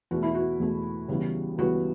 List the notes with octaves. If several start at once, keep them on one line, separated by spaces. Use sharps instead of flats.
E2 B2 A3 F#4
E4
F#4
E2 B2 A3
C#2 C#3 E3 G3 B3
C#2 C#3 E3 G3 B3 F#4